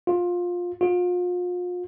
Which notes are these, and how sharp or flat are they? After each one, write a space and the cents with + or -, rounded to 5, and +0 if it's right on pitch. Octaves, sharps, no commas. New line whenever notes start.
F4 +15
F4 +35